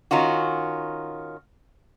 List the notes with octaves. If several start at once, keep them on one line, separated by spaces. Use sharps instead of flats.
D#3 C#4 F4 F#4